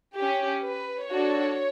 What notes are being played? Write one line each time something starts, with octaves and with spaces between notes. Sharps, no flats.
C#4 G4
B4
D4 F#4 A4 C#5